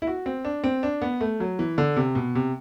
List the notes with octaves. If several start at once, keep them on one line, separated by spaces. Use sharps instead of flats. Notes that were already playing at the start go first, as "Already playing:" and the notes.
E4
F#4
C4
D4
C4
D4
B3
A3
F#3
E3
D3
C3
B2
C3